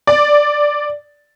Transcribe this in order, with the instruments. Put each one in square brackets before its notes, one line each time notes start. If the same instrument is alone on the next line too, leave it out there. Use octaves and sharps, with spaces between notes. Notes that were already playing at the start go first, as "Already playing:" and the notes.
[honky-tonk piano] D5